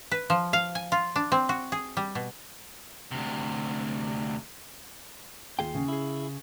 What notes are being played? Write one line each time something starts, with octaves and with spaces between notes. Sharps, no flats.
B4
F3
F5
G#5
F4
D4
C4
F#4
G#4
G3
B2
D2 C3
D#2 F4 G#4 G5
C#3
E4 G#4